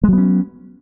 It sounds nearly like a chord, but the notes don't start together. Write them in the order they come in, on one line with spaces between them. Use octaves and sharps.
G#3 F#3 B3 C#4